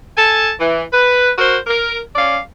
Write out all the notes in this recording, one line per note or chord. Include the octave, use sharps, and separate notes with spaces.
A4 G#5 A5
E3
B4
F#4 A#4 C5
A#4
C#4 D5 F5